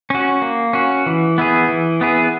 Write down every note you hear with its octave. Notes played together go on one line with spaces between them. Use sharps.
C#4 F#4
A#3
C#4 F#4
E3
B3 E4 G#4
E3
B3 E4 G#4